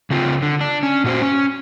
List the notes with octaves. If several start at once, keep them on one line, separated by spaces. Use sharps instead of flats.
C#3 C4 F4
D3
D4
C#4
A#2 F#4 C5
C#4